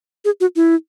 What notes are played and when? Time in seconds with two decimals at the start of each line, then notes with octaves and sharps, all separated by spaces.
0.25 G#4
0.41 F#4
0.56 E4